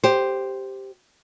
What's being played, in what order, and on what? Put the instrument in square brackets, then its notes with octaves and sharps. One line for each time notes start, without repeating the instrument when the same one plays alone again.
[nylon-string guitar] G4 C5